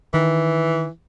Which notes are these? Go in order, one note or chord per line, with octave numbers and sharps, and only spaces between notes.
D#3 E3